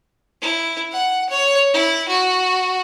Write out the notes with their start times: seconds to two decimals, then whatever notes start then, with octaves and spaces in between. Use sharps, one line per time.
0.42 E4
0.92 F#5
1.29 C#5
1.73 E4
2.08 F#4